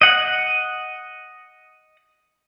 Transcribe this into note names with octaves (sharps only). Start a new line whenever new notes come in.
D#5 F#5